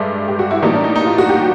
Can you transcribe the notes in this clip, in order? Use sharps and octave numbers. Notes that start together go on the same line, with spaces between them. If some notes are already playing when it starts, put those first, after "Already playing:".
Already playing: G2 G#3 A4 E5
G4
F#4
E4
A2 E3 G3 A#3 D#4
D4
D#4
D#4
F4
F#4
G4